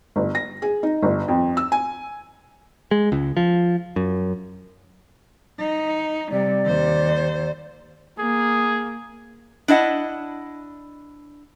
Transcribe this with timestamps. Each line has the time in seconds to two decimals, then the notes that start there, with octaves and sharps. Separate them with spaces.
0.16 G1
0.35 A#6
0.62 G#4
0.83 D#4
1.02 G1
1.28 F2
1.57 E6
1.72 G#5
2.91 G#3
3.12 C#2
3.37 F3
3.96 F#2
5.59 D#4
6.31 C3 G3 D5
6.65 D#2 C5
8.19 A#3 G#4
9.68 D4 E4 D#5 F#5